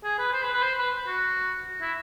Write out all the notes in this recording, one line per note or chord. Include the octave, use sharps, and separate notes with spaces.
G#4
B4
C5
B4
B4
C5
B4
F#4
E4